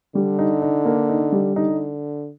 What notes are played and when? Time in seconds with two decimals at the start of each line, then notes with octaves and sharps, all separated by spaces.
0.15 D3 G3
0.39 D#4
0.62 D#4
0.85 A#3
1.09 D#4
1.32 G3
1.56 D3 D#4